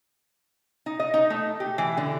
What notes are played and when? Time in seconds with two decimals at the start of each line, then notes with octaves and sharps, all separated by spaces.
0.86 D#4
1.00 D#5
1.14 D#4
1.30 A3
1.60 G4
1.78 E3
1.97 D3